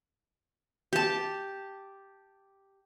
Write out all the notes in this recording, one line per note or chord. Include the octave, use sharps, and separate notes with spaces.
G4 A5